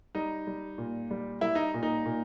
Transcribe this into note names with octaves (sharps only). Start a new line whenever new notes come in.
G3 D#4
G3
A#2
G3
G3 E4
D#4
A#2
D#4
A#2